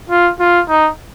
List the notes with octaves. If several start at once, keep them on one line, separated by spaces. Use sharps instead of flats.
F4
F4
D#4